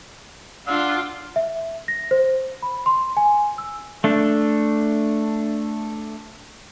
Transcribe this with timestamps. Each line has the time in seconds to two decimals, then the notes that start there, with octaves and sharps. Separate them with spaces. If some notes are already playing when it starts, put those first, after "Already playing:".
0.67 D4 F4 F#5 E6
1.36 E5
1.88 A#6
2.11 C5
2.63 B5
2.86 C6
3.17 G#5
3.58 E6
4.04 A3 D4